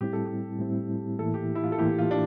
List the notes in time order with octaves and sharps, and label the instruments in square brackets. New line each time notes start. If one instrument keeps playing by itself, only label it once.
[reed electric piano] A2 G3 C4 E4 [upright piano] G4
[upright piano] A4
G4
[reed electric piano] A2 G3 C4 E4
[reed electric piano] A2 E3 A#3 E4 [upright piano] A4
[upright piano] G4
E4
F4
A4
[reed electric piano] A2 E3 A#3 E4 [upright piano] G4
[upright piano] F4
D4